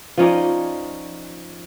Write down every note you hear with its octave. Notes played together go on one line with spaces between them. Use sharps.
F3 C#4 D#4 D5